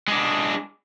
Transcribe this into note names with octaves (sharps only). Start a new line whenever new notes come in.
G#3 D4